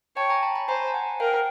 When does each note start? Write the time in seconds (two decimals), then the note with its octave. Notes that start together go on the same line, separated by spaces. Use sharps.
0.16 C#5 G5 A5
0.30 G#5 A#5
0.43 A5 B5
0.56 A5 B5
0.68 C5 G#5 A#5
0.87 A5
0.94 F#5 G#5
1.20 A#4 F5 G5